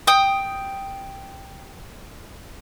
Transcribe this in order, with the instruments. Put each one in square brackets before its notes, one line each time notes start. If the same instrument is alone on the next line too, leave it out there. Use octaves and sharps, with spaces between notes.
[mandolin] G5 D#6